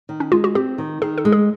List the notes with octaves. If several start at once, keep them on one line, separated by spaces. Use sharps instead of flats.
D#3
C#4
G#3 F4
F#4
C4 G4
D#3
D#3 G#4
A4
G#3
G#4